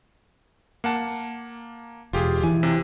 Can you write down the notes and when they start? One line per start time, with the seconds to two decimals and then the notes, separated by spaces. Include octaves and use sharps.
0.84 A#3 F#5 A5
2.13 E1 F4 G4 G#4
2.43 E3 G#5
2.63 C3